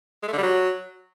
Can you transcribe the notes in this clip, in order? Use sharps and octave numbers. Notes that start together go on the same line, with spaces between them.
G#3
A3
D3
G3
F#3